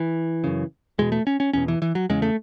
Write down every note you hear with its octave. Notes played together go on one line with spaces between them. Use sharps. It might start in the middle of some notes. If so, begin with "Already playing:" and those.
Already playing: E3
F#2 C#3
E2 B2 G#3
A3
C#4
C#4
E2 B2 C#4
E3
E3
F#3
E2 C#3 G#3
A3